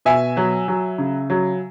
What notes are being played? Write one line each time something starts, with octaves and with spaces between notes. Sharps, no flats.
B2 E5 G#5
F#3
F#3
C#3
F#3